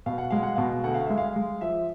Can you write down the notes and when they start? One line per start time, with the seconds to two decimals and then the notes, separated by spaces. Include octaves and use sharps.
0.06 B2 F5
0.18 F#5
0.31 G#3 F5
0.43 F#5
0.56 B2 F5
0.84 D2 F#5
0.94 F5
1.06 G#3 E5
1.18 F5
1.36 G#3
1.61 F3 E5